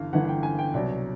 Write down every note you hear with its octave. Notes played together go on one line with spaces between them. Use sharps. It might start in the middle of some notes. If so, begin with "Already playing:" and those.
Already playing: G1 G2 E3 F5
G1 G2 E3 F#5
F#5
G5
G#5
G5
C2 B2 F#3 D5